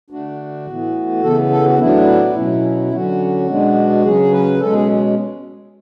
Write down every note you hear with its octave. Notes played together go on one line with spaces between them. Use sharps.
D3 A3 D4 F#4
A2 E3 B3
C#3 E3 B3 A4
A4
F#4
A2 F#3 B3 D4 E4
B2 F#3 C#4
D3 F#3 C#4 F#4
B2 G#3 B3 D4
C#3 F#3 C#4 G#4
B4
B2 G#3 C#4 A4
G#4